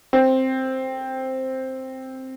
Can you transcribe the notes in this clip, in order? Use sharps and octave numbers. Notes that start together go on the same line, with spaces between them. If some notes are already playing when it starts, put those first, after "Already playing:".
C4